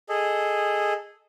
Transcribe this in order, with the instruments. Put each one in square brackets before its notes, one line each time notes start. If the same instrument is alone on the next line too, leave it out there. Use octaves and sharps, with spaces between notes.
[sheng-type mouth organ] G#4 A4 D#5